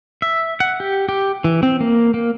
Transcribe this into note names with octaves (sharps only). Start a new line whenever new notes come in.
E5
F#5
G4
G4
E3
C4
A#3
A#3